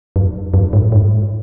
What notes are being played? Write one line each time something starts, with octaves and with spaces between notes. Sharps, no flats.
F#2
F#2
G#2
G#2